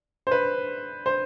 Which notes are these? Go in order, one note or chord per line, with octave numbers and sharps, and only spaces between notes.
C5
B4
C5